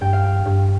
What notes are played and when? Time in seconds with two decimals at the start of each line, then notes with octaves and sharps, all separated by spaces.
0.01 G2 G5
0.13 F5
0.24 G5
0.46 G2